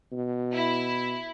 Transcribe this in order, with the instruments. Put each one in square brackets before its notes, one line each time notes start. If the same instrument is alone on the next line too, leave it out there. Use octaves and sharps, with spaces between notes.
[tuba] B2
[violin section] E4